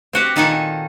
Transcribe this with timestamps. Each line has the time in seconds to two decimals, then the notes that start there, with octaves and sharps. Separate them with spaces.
0.13 C4 F#4 G4
0.36 A#2 D#3 D#4 A4 F#5 G#5